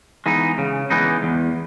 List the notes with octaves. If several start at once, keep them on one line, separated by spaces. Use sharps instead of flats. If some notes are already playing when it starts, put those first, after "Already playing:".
E3 G#3 B3 D#4
C#3
E3 G#3 B3 D#4
E2